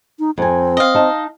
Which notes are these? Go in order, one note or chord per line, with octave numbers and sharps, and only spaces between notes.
D#4
F2 C4 G#5
D#5 F5
D#4 A5